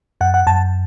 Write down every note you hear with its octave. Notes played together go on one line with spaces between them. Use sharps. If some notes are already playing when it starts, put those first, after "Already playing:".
F#2 F#5
F#5
F#2 A5